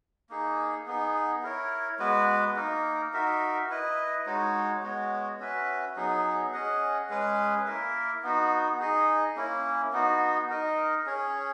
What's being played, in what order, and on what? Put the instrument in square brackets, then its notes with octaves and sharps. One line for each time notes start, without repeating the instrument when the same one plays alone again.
[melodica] A#3 D#4 G#4
B3 D#4 G#4
E4 A#4 C#5
G#3 B3 F#4 B4
A#3 D#4 A#4
D#4 F#4 A#4 E5
E4 B4 D#5
G#3 D#4 F#4 C#5
G#3 B3 F#4 C#5
C#4 F#4 B4 E5
F#3 B3 D#4 G#4
C#4 G#4 D#5 F#5
G#3 C#4 G#4 B4
A#3 E4 A#4 E5
B3 D#4 F#4
D#4 G#4 D#5
A#3 C#4 E4
B3 D#4 F#4
D#4 A#4 D#5
C#4 G#4 C#5